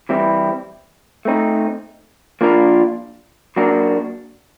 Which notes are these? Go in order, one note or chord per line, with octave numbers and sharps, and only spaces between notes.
E3 G3 C4 E4 G4
A3 C4 D#4
F3 A#3 D4 F4 A#4
F#3 A#3 D4 F#4 A#4